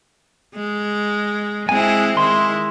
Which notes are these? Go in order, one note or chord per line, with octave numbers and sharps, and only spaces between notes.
G#3
G#3 C4 E4 G#5
D#3 G#3 E4 C6